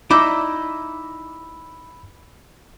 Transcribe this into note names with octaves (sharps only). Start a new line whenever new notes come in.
D#4 E4 D5 B5 D6 E6